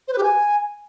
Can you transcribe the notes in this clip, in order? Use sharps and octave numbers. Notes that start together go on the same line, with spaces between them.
C5
B4
G4
G#5